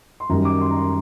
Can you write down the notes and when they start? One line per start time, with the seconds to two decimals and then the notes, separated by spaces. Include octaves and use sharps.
0.20 C6
0.29 F#2 D#3 G3 A#5
0.45 D6
0.61 C6
0.71 A#5
0.76 C6